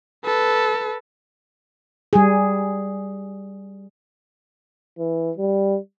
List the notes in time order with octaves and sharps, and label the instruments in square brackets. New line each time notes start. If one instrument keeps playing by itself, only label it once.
[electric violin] A4 B4
[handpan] G3 G#4
[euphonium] E3
G3